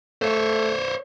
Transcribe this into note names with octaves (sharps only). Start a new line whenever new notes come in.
A3 C5 C#5